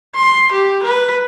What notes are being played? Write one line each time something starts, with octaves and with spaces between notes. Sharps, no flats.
C6
G4
B4